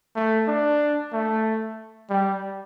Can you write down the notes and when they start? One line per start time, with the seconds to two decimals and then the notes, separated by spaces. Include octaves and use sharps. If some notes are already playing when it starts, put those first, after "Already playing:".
0.16 A3
0.48 D4
1.13 A3
2.10 G3